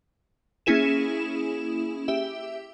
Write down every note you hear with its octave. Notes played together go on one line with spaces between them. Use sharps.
A#3 C#4 E4 G#4 E7
G4 E5